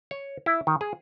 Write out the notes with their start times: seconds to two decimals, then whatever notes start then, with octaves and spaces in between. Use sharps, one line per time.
0.11 C#5
0.46 E4
0.67 D#3
0.81 G#4